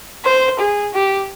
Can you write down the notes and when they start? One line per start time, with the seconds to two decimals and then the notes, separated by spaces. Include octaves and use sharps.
0.25 C5
0.59 G#4
0.94 G4